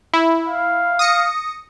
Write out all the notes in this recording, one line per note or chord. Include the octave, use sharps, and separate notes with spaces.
E4
F5
D#6 A#6 C#7